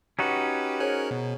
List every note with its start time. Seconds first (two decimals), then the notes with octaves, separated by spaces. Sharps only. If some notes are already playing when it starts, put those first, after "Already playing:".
0.19 C#4 D#4 F#4 G4 B4
0.80 G#4 A#4 C5 C#5 G#5 F#6
1.11 B2